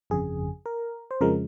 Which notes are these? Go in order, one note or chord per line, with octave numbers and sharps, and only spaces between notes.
G1 F2 C#3 G#4
A#4
C5
F2 C#3 F3 G#3 A#4